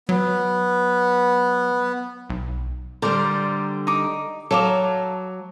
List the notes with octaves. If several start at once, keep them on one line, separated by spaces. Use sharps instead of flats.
F#3 B3
B1
D3 G3 A#4 C5 D5
D#4 D6
F#3 A4 F5 D6